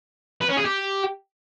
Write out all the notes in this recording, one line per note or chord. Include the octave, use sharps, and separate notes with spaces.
B4
C#4
G#4
G4